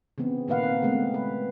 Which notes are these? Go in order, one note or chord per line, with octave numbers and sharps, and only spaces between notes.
C#3 E3 B3 C4
A#2 D#3 A#3 B4 F5 F#5
C4
C#3 G#3 A3 B3 C4
B4